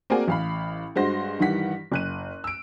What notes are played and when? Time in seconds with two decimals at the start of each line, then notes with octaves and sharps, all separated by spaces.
0.10 A#3 C4 F#4 G#4 D5 G#5
0.28 A1 F5 B5
0.96 G2 G#3 F#4 C5 C6 A#6
1.39 G2 D#3 E3 G3 F#5 B6
1.92 F#1 F#6 D#7
2.44 E6 D7